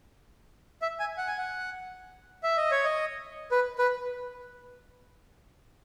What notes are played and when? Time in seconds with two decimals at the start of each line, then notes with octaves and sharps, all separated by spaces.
0.82 E5
1.00 G#5
1.17 F#5
1.27 G#5
1.38 F#5
2.43 E5
2.57 D#5
2.71 C#5
2.85 D#5
3.52 B4
3.79 B4